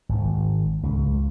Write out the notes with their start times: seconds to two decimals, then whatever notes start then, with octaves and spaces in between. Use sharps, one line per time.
0.09 G#1
0.83 C#2